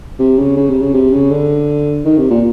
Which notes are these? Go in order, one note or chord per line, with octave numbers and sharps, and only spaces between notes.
C3
C#3
C#3
C3
C#3
C3
C#3
D3
D#3
C3
A#2